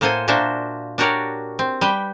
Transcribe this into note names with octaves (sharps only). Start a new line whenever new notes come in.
A2 A#3 A4 C5 F#5 G#5
A#2 A#3 D4 F#4 C5 E5
D4 F#4 G4 A#4 C#5 D5
C4
G3 G4 B4 G5